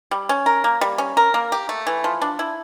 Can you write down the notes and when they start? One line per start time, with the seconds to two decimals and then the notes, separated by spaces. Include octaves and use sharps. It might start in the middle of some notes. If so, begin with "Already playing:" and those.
0.11 G3
0.29 C#4
0.46 A#4
0.64 A#3
0.81 G3
0.98 C#4
1.17 A#4
1.34 A#3
1.52 G4
1.69 A3
1.87 E3
2.04 F3
2.22 D4
2.39 E4